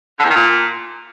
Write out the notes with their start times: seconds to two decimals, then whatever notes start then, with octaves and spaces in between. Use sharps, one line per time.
0.18 D3
0.24 E2
0.29 D#3
0.34 A#2